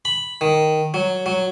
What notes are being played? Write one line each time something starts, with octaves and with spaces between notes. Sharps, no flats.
B5
D#3
F#3
F#3